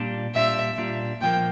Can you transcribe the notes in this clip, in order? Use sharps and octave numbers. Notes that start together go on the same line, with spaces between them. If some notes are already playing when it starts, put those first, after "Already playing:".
Already playing: A#2 G3 D4 F4
A#2 G3 D4 F4 E5
A#2 G3 D4 F4
A#2 F3 A#3 G5